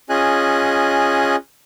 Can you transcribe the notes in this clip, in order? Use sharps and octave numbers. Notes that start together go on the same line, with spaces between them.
C#4 F4 G#4 D#5 G#5 F#6